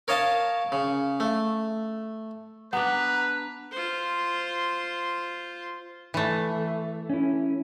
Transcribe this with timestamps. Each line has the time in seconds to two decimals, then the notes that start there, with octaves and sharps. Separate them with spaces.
0.08 A#4 C#5 D#5 F5 A5
0.72 C#3
1.20 A3
2.73 B3 D4 B4 F#5 A#5
3.72 F4 C5
6.14 E3 A3
7.10 C#4 E4